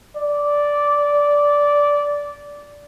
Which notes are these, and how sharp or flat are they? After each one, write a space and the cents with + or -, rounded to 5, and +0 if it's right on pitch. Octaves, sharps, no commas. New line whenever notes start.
D5 -10